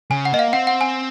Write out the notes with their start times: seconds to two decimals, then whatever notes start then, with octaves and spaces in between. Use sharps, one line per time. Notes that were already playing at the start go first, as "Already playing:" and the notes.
0.11 C#3 G#5
0.25 F#5
0.32 A#3 D#5
0.39 F5
0.53 C4 F#5
0.67 F#5
0.81 G#5